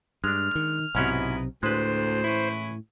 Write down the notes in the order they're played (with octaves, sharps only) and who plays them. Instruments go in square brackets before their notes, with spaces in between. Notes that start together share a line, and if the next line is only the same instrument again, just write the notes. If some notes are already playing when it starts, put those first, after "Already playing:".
[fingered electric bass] G2 [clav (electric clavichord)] G#3 D4 [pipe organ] F6
[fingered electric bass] D#3
[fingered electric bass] B1 C3 [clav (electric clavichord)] G#2 C#4 F#4 [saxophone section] B3 D#4 E4
[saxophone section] D2 [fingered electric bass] A2 [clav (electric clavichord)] G#3 B4 [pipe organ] C5
[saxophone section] E3 C#4 E4